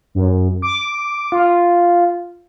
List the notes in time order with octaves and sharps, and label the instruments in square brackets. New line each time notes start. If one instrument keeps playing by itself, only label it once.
[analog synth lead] F#2
D6
F4